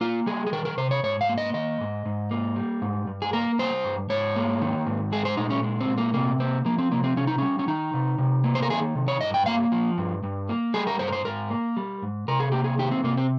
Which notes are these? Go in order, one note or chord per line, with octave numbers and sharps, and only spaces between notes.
A#3 F4
G3 G#4
G#4
D#3 A#4
A#4
C3 C5
C#5
G#2 C#5
F5
A#3
D#5
D#3 D#5
G#2
G#2
A#3
G3
G#2
G2
G#4
A#3 A#4
G3 C5
G2
G#2 C#5
A#3
D#3
G#2
G#3 G#4
C5
A#2 D#4
C#4
G#3
C4
A#2
A#3
C3 A#3
A#3 C4
F3 A#3
C4
C3 A#3
C4
C3 C#4
D#4
G3 C#4
C#4
D#3 D#4
C3
C3
A#3
C5
A#4
D#3 G#4
C3
C#5
G2 D#5
G5
A#3 F5
F3
G2
G2
A#3
G3 G#4
A#4
G2 C5
A#4
C5
G#2 A#4
A#3
G3
G#2
C3 A#4
G#4
A#3 G4
G#4
D#3 G4
C4
C3 A#3
C4